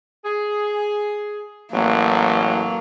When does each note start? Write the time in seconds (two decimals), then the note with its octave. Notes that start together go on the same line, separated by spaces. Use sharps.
0.24 G#4
1.73 A1 F#3 A#3